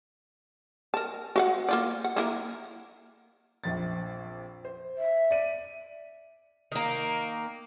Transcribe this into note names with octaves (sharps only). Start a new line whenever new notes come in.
A#4 A5
F#4 F5 F#5
A#3 F4 D5
F#5
A#3 E4 A#4
A#1 F2 A6
C5
E5
D5 D#7
D#3 A#3